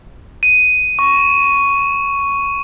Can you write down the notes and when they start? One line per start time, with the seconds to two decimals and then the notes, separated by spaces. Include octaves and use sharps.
0.43 D#7
0.99 C#6